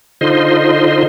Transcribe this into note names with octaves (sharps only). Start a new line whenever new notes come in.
D3 D#4 F4 C5 D#5 C6